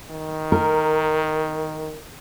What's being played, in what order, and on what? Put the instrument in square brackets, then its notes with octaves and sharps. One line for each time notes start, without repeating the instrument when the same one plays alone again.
[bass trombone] D#3
[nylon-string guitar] A#4